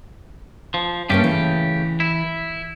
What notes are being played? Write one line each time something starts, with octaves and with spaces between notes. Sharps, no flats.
F3
G2 C#3 A3 A#3 C#4 G4
E3
E4